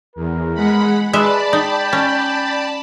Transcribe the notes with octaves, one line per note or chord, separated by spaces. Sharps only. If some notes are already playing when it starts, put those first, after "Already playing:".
E2 A#4
G#3 F#5 B5
G#3 B4 D5 E5 A5 B5
D#4 G5
C#4